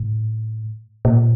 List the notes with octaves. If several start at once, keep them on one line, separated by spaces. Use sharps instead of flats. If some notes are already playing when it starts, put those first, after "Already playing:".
Already playing: A2
A#2